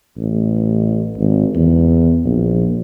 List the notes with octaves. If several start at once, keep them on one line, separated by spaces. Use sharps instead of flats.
A1
G#1
E2
A#1